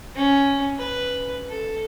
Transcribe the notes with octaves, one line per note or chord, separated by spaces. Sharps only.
C#4
B4
A4